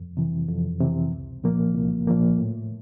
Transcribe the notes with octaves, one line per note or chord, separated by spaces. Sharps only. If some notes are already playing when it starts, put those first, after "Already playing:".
Already playing: F2
C3 E3
F2
C3 E3
C2
A#2 F3 A#3
C2
A#2 F3 A#3
A2